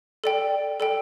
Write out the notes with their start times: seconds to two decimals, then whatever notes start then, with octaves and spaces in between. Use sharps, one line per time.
0.24 A4 D5 G5
0.80 A4 D5 G5